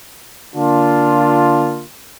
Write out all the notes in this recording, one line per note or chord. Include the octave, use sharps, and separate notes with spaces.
D3 A#3 D4 F4